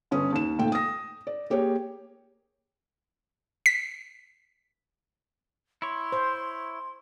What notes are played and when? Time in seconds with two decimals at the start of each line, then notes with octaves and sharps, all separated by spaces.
0.11 G1 C#4 D#6
0.32 D#2 E7
0.59 G#1 A#2 A3 G5
0.72 D#6 A#6
1.27 D5
1.50 A#3 G4 G#4 C#5
3.66 B6
5.82 E4 C#5 C6
6.12 C5